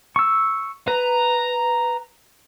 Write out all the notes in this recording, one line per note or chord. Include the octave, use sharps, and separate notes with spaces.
C#6 E6
B4 A#5